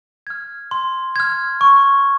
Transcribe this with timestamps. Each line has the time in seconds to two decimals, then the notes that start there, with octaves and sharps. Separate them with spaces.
0.27 F6 G#6
0.71 C6
1.16 F6 G#6
1.61 C#6